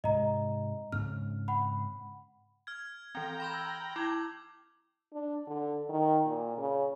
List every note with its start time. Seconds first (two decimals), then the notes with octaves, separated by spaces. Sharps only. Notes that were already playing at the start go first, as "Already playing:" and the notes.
0.04 G#2 C3 G#3 D#5 A#5
0.92 G#2 C#3 C4 F6
1.48 F#5 B5
2.67 F6 G#6
3.15 E3 C4 G5 A#5
3.40 B5 C6 G6
3.54 E6
3.96 E4 D6 G#6
5.13 D4
5.47 D3
5.89 D#3
6.26 A#2
6.58 C#3